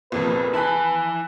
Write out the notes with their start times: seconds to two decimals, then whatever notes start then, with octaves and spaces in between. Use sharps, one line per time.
0.12 C2 F2 A#2 B3 G#4 B4
0.54 E4 G#5 A5 B5 F#6